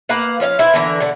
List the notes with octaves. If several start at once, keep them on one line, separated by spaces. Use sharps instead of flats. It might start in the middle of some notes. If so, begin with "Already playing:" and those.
A#3 B4 F5 F#5
F3 C#4 D#5 F5
E4 B4 C5 E5
D3 E3 A#4
D3 F#4